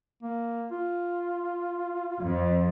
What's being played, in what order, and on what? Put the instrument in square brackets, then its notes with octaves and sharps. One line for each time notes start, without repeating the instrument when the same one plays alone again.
[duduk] A#3
F4
[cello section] F2